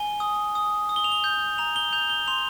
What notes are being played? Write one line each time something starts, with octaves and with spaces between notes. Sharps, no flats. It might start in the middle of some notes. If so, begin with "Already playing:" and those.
Already playing: G#5 G7
D#6
D#6
D#6
G7
F7
G7
G6
A#5 F7
G7
G6 F7
G7
C6 F7